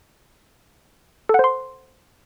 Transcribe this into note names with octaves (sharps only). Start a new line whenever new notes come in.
A4 C5 F#5 C6